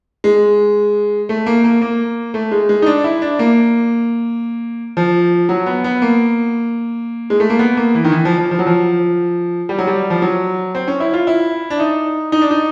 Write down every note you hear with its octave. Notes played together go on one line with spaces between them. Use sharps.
G#3
A3
A#3
A#3
A#3
A3
G#3
G#3
D#4
D4
E4
D4
A#3
F3
F#3
B3
B3
A#3
G#3
A3
A#3
B3
A#3
E3
D#3
E3
F3
F3
F3
F#3
F3
G3
F#3
G3
F3
F#3
C4
C#4
E4
F4
E4
D4
D#4
D#4
D4
D#4